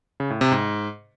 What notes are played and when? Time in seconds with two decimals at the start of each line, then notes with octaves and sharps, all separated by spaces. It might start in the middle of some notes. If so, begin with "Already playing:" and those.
0.20 C#3
0.30 A2
0.41 C3
0.52 G#2